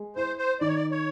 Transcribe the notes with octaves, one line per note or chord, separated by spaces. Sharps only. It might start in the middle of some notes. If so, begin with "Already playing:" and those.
Already playing: G#3
E4 C5
C5
D#3 D5
C#5
D5
C#5